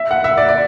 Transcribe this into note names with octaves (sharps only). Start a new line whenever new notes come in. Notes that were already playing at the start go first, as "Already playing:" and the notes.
Already playing: E5
F#5
E5
D5
D5